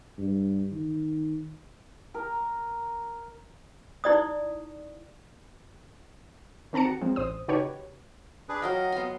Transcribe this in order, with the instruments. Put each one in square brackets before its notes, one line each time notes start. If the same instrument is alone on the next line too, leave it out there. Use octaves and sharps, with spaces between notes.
[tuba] G2
D#3
[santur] A#4
[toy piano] D#4 E4 D5 D#6
[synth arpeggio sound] D#3 C4 A5 A#5 C#7
F#4
F3 G#3 A#3 C4
A1 C5 D#6
C#3 D#4 F#4 G4 B4 C#5
[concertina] D4 G#4 B4
[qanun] F#3 A#4 G5 [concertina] D#5 F5
[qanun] B3 C6